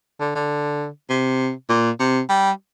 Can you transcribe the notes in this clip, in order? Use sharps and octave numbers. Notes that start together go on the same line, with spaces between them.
D3
D3
C3
A#2
C3
G3